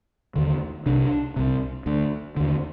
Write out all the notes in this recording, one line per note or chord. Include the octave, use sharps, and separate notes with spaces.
D#2 D3
C2 C3 D4
C2 C3
D2 D3
D#2 D3